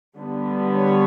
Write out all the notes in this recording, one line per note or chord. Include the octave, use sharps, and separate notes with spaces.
D3 G3 B3
C#5